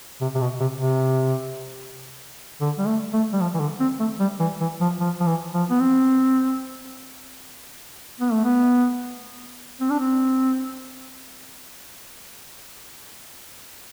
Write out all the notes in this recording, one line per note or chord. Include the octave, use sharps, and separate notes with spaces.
C3
C3
B2
C3
C3
D3
G3
A3
A3
G3
F3
E3
D3
C4
A3
G3
E3
E3
F3
F3
F3
E3
F3
B3
C4
B3
A3
B3
C4
D4
C4